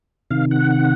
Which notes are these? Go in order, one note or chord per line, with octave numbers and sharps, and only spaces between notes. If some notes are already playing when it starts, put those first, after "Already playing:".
C3 D#3 F5
F#5